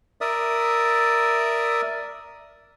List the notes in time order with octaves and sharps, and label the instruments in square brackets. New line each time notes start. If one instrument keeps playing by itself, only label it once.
[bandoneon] A#4 D5 E5 D#6